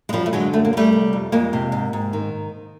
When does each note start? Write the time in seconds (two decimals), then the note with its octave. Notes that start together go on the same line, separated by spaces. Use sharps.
0.09 G#3
0.13 F#2 F3 G3
0.26 A3
0.33 D3 F#3 G#3
0.53 F#2 A3
0.65 A#3
0.73 D3
0.77 G3 A3
0.93 C3
1.13 F2
1.32 F2 G#3 A#3
1.53 C3
1.72 G#2
1.93 G#2
2.13 D#3